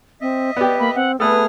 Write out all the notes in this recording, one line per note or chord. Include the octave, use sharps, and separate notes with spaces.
C4 D#5 E5
B3 G4 D5
A#3 B5
C4 F#5
A3 B3 G#4 A4 B4 D#6 F6